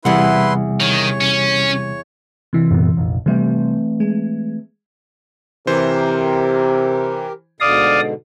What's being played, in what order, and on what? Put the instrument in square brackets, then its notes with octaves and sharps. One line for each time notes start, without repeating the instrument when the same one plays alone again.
[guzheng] E2 F#5 [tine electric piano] C3 G3 [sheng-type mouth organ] E4 B4 C6
[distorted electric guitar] D#3 [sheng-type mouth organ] C#5
[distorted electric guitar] C#4
[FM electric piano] C3 E3
[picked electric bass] F#2 A#2 B3
F1 A#1
[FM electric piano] C3 G3 [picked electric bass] E3 A3 C4
[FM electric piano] G#3
[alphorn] C3 [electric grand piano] E3 C5 [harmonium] G4 A#4
[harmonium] G#2 B2 D3 [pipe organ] D5 F5 D#6